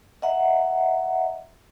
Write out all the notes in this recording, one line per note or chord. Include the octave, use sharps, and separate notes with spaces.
D#5 E5 F#5 A#5